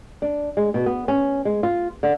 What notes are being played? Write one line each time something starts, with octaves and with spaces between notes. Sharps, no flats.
D4
G#3
B2
B3
C#4
G#3
F4
D3